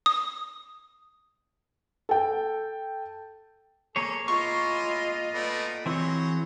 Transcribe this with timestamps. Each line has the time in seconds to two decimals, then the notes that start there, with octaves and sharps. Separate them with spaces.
0.06 D#6
2.09 A4 G5
3.96 A#3 G#4 A4 C#5
4.28 E4 F4 D#5 C6 C#6
5.34 A3 B3 D5
5.86 E3 F#3 G#3 C4 C#5